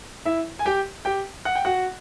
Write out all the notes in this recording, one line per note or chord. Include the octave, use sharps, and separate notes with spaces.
E4 E5
G#5
G4 G5
G4 G5
F#5
G5
F#4 F#5